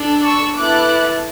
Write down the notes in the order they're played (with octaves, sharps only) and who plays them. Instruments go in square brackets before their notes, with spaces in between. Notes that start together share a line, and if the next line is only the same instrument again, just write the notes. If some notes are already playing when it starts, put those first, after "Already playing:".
Already playing: [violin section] D4 A4
C#6 E6
B3 E4 A4 D6 F#6